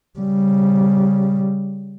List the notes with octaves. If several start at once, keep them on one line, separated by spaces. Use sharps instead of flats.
C#3 G3